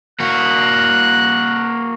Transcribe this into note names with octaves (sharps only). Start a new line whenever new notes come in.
A#3 F#4 F#6